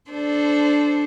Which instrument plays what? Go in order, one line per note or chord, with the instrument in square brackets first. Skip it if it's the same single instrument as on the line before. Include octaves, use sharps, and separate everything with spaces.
[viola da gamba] D4 A4 C5